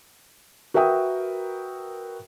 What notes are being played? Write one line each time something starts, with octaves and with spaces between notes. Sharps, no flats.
F#4 A#4 B4 E5 G5 D#6